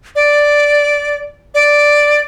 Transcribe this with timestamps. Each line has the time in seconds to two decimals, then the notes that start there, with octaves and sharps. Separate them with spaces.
0.15 D5
1.54 D5